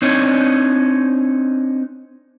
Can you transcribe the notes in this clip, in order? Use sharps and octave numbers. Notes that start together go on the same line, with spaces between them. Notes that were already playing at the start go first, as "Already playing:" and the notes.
C4 D4 D#4 C#5